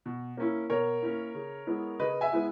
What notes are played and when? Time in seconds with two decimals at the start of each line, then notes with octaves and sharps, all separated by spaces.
0.06 B2
0.37 A#3 C#4 E4
0.70 B2 A#4 C#5
1.02 A#3 C#4 E4
1.34 C#3
1.67 G#3 B3 E4 B4
2.00 C#3 B4 D#5
2.21 E5 G#5
2.33 G#3 B3 E4 B4